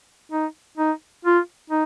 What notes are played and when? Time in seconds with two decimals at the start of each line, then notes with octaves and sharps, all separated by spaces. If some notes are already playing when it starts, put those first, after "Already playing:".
0.32 D#4
0.77 D#4
1.25 F4
1.70 D#4